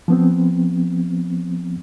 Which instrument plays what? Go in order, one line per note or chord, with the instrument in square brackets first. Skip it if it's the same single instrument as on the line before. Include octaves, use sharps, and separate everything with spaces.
[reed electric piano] F3 B3 C4